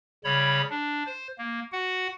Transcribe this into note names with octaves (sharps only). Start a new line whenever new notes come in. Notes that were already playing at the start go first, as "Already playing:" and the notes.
C#3 G3 C#5 B5
D4
C5
A#3
F#4 F#5